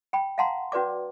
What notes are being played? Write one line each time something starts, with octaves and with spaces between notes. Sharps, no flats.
G5 B5
F5 F#5 A5 A#5 C6
C#4 F#4 B4 D5 D6